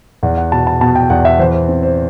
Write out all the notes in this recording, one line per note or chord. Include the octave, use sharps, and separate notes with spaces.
E2 F#5
F#5
B2 A5
A5
B2 A5
G5
E2 F#5
E5
E3 C5
C5
C4
C5